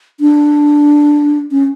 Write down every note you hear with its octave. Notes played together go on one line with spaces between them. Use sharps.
D4
C#4